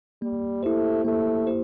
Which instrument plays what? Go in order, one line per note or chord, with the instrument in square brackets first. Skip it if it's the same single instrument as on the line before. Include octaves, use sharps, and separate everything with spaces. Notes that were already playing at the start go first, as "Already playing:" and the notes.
[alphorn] G3 [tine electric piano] A#3
[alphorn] A3 [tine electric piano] E4 G4 C5
[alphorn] A3 [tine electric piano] A#3
[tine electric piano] E4 G4 C5